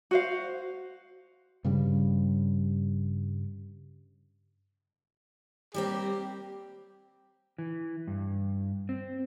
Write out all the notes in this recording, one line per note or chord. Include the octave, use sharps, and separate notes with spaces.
F#4 C5 F5
G2 C#3 G3
G3 A#3 C4 G4
E3
G2
C4